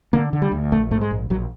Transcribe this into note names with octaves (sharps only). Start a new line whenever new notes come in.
D3 A#3
D3
G3
D2
A#1 A3
G#2 A3
G#3
A#1
A#1 F#3